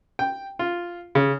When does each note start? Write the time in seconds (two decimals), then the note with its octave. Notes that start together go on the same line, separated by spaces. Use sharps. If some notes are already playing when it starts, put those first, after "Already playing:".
0.19 G5
0.59 F4
1.15 C#3